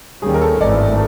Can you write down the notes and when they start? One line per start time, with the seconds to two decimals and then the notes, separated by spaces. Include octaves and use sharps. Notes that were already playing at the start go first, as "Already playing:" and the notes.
0.22 D#2 D#3 G3 A#3 C#4 G#4
0.34 A#4
0.41 A4
0.61 G#1 G2 E3 A3 D5